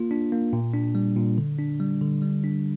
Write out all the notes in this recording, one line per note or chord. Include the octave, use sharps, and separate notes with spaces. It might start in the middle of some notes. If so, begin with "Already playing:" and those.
Already playing: A#3 F4
D4
A#3
A#2
D4
G3
A#2
D3
D4
G3
D3
G3
D4